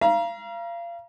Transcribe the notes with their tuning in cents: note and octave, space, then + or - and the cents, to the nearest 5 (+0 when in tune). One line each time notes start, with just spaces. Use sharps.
F5 -30 A#5 +30